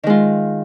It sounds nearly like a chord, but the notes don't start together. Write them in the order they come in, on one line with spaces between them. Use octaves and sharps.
D#3 G#3 F4